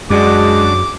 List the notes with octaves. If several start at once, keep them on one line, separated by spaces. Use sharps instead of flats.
F#2 G#3 D4 F#4 D6